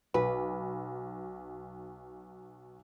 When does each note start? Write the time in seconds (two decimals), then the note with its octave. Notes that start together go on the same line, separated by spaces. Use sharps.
0.14 B1 B4